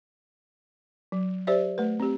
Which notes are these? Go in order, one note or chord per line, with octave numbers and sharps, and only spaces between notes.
F#3
G4 C5 D5 E5
A3 B4
C4 G4